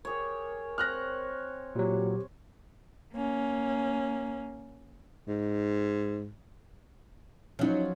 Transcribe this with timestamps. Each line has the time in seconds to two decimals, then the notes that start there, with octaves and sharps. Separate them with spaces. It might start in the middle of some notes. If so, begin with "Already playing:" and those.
0.05 G4 G#4 A#4 C#5
0.78 C4 C#5 F6 F#6 A#6
1.75 A#2 F#3 G4
3.13 A#3 C#4
5.28 G#2
7.59 F3 F#3 C#4 D#4